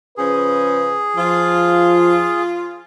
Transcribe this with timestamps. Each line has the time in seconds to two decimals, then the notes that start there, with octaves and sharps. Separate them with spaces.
0.17 C#3 F3 C#4 G#4 B4
1.17 F3 F4